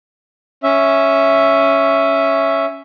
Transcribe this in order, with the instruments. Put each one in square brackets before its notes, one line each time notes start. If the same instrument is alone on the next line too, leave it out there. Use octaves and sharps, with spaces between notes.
[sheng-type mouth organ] C#4 E5